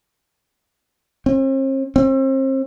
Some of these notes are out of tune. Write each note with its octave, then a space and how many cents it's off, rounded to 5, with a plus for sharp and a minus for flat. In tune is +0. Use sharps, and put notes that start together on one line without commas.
C4 +45
C4 +35